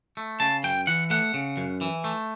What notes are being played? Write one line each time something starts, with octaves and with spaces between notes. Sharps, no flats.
A3
C#3 A5
F#2 G5
E3 F#5
A3 F#5
C#3
F#2
E3
A3